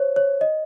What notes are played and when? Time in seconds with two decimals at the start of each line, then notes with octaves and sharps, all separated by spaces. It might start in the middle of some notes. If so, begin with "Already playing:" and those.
Already playing: C5 C#5
0.16 C#5
0.41 D#5